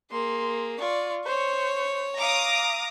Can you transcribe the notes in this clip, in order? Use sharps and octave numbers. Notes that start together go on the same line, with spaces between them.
A#3 G#4 C6
F4 D5 C#6
C5 C#5 C#6
F5 A#5 D6 D#6